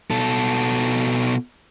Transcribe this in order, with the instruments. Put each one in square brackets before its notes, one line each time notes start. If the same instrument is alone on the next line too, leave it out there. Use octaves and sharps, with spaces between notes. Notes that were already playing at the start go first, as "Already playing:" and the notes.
[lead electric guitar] B2 A4